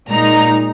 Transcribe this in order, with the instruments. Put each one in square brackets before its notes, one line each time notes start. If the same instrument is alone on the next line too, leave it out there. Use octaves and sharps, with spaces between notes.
[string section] A#2 G#3 D#4 A#5